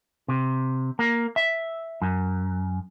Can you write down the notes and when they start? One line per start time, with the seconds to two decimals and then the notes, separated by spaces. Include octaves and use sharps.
0.28 C3
0.99 A#3
1.36 E5
2.02 F#2